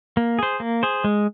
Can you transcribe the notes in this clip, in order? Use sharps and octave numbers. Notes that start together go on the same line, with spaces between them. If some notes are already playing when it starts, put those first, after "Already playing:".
A#3
G#4 C5
A#3
G#4 C5
G#3